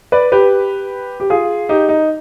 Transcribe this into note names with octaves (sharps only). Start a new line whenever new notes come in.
B4 D5
G4 B4
G4
F4 G#4
D#4 G4
D#4